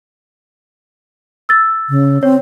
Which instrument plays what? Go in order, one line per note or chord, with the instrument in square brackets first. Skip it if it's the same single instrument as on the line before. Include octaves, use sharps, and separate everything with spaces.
[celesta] E6 A6
[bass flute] C#3
[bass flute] C4 [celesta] C#5